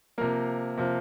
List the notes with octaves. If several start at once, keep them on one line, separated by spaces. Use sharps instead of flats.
C3 F3 A#3 A#4
C3 F3 A#3